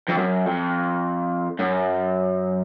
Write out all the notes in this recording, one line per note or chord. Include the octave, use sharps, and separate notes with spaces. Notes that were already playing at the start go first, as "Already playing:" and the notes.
F2
F#2
F2
F#2